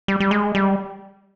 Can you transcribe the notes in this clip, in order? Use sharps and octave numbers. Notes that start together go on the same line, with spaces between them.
G3
G3
G#3
G3